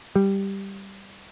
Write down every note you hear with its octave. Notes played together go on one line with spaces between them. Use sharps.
G3